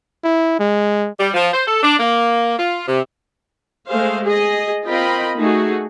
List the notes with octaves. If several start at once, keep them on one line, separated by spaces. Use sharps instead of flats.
E4
G#3
G3
F3
C5
A4
D4
A#3
F4
C3
G#3 A3 G#4 C5 F5
G#4 D#5
C4 F4 A#4 D#5 G5 B5
A3 D#4 F#4 G#4